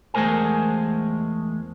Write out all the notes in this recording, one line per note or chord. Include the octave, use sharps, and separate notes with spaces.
E2 G#3 A3 A#4 C5 G#5